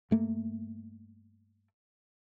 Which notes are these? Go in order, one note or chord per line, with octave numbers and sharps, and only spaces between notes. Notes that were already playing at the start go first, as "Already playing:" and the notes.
G2 A3 A#3